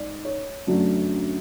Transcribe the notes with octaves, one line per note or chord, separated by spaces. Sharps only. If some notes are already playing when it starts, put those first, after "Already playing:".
Already playing: G#2 D5
C#5
F#2 D3 F#3 A3 D4